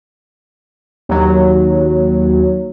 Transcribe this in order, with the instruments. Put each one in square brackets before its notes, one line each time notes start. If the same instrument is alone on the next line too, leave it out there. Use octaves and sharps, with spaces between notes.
[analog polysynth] D#2 F#3